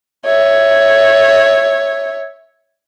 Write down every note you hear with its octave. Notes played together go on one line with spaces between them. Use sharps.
C#5 E5